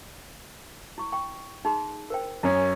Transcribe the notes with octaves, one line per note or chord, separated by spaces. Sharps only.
E4 C#6
G5 C#6
D#4 G#4 C6
A#4 C5 G5
F#2 C#4